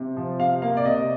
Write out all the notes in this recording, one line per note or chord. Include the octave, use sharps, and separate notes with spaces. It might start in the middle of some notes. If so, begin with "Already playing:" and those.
Already playing: C3
F3
C3 F5
A#3 F5
D5
C3 D#5